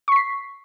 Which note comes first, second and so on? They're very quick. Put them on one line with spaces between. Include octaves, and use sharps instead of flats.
C#6 B6 C7